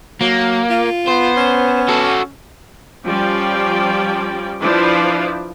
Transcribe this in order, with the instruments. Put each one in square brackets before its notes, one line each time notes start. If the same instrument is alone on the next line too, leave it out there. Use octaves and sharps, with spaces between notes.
[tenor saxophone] F#3 [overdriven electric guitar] A#3
[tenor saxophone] F4
[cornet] B3 [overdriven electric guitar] C5
[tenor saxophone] C#4
[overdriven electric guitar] F#4 A4
[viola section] F3 G3 C#4 D5 G5
F3 D4 E4 B4 C5 D5